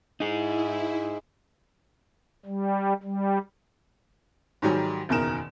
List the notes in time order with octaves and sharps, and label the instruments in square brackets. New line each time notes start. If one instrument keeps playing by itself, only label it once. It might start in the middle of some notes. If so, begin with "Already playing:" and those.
[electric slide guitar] D#4 G#4 [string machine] E4
[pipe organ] G3
G3
[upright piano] G#2 D#3 F#3 G3 G#5 A#5
F#1 E2 B2 D#3 A#4 E7